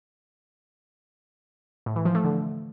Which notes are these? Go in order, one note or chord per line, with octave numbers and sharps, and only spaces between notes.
A2
E3
F3
A3
D3